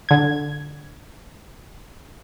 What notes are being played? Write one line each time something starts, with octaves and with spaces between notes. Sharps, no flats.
D3 G#6